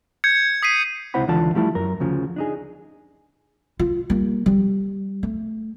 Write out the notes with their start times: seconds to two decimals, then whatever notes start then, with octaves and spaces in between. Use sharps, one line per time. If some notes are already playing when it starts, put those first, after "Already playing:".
0.24 G6 G#6 C#7
0.63 D#6 B6 C7 D#7
1.14 C#2 C3 E4 C5 F#5 B5
1.27 C#2 D3 E3 F4 D5 A5
1.54 F3 G3 A3 E4 A5
1.75 F#2 A#4
2.00 D2 C#3 F3
2.36 D4 D#4 G#4
3.79 F4
4.10 G3 A#3
4.46 G3
5.23 A3